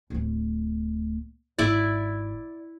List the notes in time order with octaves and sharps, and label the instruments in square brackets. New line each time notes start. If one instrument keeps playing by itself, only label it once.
[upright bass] D1 A3
[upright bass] G#1 [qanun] E4 D5